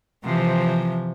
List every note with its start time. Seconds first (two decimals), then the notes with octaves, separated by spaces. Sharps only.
0.25 C3 E3 F3